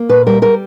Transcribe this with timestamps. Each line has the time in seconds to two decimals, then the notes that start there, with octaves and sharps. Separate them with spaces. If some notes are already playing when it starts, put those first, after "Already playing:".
Already playing: A#3
0.09 A#2 B4
0.27 G3 A#4
0.42 G3 A#4